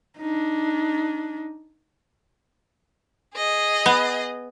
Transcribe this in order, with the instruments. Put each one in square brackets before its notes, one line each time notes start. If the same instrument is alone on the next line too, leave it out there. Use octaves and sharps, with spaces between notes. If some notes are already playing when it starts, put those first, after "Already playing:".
[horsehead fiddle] D4 D#4
[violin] G#4 D#5
[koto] B3